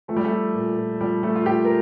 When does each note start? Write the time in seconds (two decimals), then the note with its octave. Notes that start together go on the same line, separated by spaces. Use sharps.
0.08 F3 A3
0.16 G3
0.24 A3
0.32 F3
0.55 A#2
0.77 A#2
1.01 F3 G3
1.23 F3 A3
1.35 F4
1.46 A#2 G4
1.65 A#4